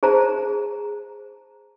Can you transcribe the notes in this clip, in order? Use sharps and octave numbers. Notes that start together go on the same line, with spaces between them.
G#4 C5 A5 A#5